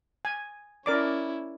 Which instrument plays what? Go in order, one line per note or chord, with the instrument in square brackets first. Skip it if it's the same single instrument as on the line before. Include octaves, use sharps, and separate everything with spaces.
[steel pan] G#5
[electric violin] C#4 E4 [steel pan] A#4 D5 D6